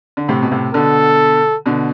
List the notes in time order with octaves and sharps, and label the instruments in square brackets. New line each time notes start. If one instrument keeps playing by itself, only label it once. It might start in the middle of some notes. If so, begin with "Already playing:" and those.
[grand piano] D3
A2 C3
B2
A2 C3
[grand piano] B2 D3 [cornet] A4
[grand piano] B2 D3